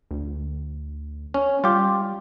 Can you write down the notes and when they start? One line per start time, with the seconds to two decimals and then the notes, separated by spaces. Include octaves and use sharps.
0.11 D2
1.34 C#4
1.64 G3 F4 G4